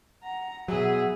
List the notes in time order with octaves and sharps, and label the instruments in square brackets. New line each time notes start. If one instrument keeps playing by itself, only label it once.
[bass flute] F#5 [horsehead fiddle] A#5
[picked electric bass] B2 F#3 [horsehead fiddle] G#4 E5